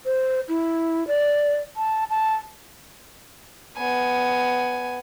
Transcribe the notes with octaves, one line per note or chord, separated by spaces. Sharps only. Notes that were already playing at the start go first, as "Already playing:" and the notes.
C5
E4
D5
A5
A5
B3 G#5